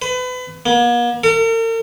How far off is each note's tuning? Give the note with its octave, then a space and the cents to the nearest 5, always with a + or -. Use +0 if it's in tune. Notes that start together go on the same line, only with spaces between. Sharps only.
B4 +30
A#3 +45
A#4 -45